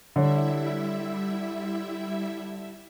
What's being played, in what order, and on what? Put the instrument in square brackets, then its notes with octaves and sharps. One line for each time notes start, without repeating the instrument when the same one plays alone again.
[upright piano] D3 C#5 [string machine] G3 E4 E5